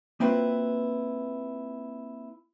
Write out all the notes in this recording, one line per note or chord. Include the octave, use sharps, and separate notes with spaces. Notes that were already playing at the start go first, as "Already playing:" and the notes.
A#3 C4 E4 F4 B4